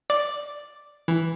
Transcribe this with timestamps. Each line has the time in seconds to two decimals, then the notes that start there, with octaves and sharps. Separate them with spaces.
0.10 D5
1.08 E3